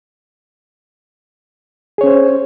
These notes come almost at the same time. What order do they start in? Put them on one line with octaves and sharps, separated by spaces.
G#4 C#5 C#4 C5